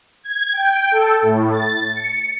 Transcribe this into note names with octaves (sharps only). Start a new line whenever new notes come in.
G#6
G5
A4
A2
A6
C#7